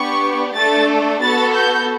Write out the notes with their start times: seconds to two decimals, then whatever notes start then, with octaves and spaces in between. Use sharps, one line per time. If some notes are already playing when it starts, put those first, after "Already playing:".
Already playing: B3 D4 G4 C#6
0.56 A3 D4 A4 A6
1.22 B3 F#4 A4 A6
1.56 G6